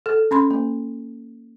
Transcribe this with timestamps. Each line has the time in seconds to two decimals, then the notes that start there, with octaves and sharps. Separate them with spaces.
0.06 A4
0.31 C#4 B5 C6
0.50 A#3